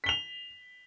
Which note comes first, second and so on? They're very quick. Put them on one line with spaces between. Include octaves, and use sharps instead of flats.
B6 G7 F7